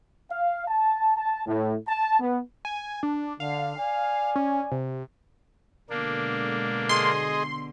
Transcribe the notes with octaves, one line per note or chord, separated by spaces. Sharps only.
F5
A5
A5
A2
A5
B3
G#5
D4
D3 F5
D5 G#5
C#4
C3
B2 D3 G#3 A#3 D4
G#4 D#5 C6